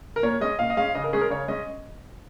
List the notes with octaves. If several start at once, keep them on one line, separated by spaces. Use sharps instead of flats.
A#4
A#2 C#5
G#3 C#4 D#5
A#2 F5
D#5
G#3 C#4 F5
C#3 D#5
A#4
G#3 C#4 G#4
A#4
C#3 C#5
G#3 C#4 D#5